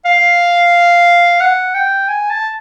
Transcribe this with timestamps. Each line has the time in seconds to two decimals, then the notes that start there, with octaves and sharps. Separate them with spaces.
0.05 F5
1.40 F#5
1.75 G5
2.08 G#5
2.30 A5